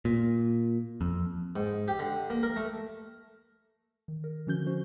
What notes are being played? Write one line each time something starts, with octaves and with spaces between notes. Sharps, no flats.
A#2
F2
G#2
G4
D3
A#3
A#4
A3
D#3
A#4
D3 F3 C#4 F#4 G6 G7
C#4 F#4 C5